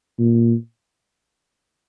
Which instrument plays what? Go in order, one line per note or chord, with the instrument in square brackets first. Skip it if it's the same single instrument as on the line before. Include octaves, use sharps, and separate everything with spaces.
[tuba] A#2